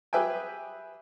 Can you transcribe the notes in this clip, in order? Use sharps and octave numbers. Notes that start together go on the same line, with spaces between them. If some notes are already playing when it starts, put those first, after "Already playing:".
G4 G#4 B4 E5 G5 G#5